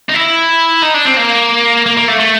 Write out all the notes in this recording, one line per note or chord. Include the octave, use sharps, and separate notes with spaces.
D#4
E4
D#4
D4
C4
A#3
A#3
A#3
A3
A3